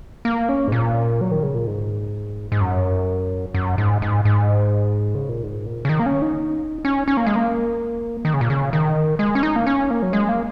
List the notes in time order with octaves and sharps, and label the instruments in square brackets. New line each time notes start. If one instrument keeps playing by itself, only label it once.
[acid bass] A#3
C#4
G#2
A#2
F#3
D#3
C#3
A#2
G#2
G#2
F#2
F#2
G#2
G#2
G#2
C#3
A#2
G#2
A#2
C#3
D#3
A#3
C#4
D#4
C#4
C#4
A#3
G#3
A#3
D#3
C#3
A#2
C#3
D#3
G#3
C#4
D#4
A#3
C#4
A#3
F#3
G#3
A#3